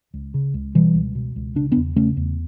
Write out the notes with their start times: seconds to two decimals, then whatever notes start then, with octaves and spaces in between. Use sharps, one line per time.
0.14 C#2
0.34 C#3
0.54 C#2
0.75 B2 E3 G3
0.94 C#2
1.15 B2
1.36 C#2
1.55 C#3 D4
1.72 B3 D4
1.76 E2
1.96 C#3 A3 C#4
2.17 E2